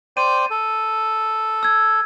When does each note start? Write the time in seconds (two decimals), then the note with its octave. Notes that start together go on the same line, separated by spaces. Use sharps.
0.17 C5 D5 G5 D#7
0.50 A4
1.63 E6 G#6